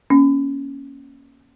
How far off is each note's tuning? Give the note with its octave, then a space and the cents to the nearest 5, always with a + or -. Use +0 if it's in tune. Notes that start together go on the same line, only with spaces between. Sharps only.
A#3 +25 C#4 +0